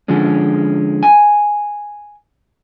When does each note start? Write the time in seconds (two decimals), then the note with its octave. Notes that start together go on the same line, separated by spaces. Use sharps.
0.08 D3 F3 G#3 C#4
1.03 G#5